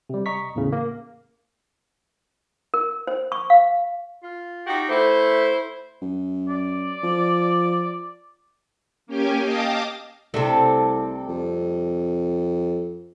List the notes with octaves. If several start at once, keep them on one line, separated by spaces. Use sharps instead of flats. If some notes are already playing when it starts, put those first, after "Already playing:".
C3 G3
D#5 A#5 C#6 B6
E2 A2 C#3
A#3
A#4
C5
C#6
F5
F4
D#4 F#4 G4
A3 E4 B4 C5
F#2
D5
F3
A#3 C#4 G4 G5 G#5
D#5 F5 G5 A5 D6 D#6
C2 C3 G3 A3 D4 A4
F2